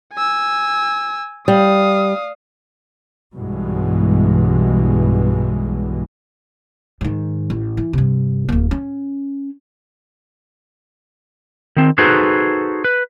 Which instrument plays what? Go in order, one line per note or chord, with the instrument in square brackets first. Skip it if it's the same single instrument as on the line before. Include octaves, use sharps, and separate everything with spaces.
[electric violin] G#5 E6
[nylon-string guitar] G3 [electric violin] F5 D#6
[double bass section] B1 G2 B2 E3 G#3
[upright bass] G#2 D#3
A1
E3
G2 C3
D1 A#3
C#4
[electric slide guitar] D#3 C4
D#4 F#4 G#4 A4 B4 C5
B4